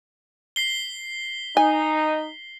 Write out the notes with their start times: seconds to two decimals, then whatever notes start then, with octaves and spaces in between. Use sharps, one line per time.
0.56 B6 C7 G7
1.57 D#4 G#5